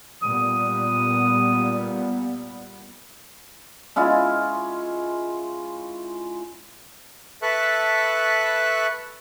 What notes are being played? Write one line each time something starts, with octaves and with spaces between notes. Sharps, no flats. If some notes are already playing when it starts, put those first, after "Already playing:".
A#2 G3 B3 D#6
G#3 C#4 E4 F4
A4 B4 E5 A5 C#6 F#6